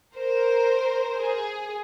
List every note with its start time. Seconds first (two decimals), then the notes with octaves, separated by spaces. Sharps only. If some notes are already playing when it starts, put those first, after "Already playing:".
0.16 A#4 C5
1.18 G#4